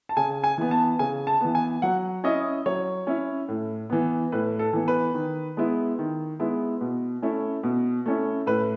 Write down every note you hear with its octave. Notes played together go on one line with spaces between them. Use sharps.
A5
C#3 G#5
G#5
E3 B3
A5
C#3 G#5
A5
E3 B3
G#5
F#3 F#5
C#4 E4 D#5
F#3 C#5
C#4 E4
A2
E3 B3
A2 B4
A4
E3 B3
B4
D#3
G#3 B3 E4
D#3
G#3 B3 E4
B2
A3 C#4 E4
B2
A3 C#4 E4
A2 B4